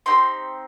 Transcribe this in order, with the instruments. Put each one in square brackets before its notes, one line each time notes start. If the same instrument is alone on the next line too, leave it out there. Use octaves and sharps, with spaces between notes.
[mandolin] C4 D#4 G4 C6